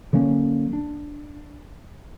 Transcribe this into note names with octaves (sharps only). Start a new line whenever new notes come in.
D3 F#3 A#3 C#4
D4